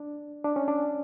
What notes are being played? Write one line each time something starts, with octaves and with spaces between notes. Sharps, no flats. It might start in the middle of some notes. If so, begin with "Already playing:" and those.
Already playing: D4
D4
C#4
D4